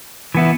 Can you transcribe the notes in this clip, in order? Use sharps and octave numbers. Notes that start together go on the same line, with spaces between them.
E3 B3 E4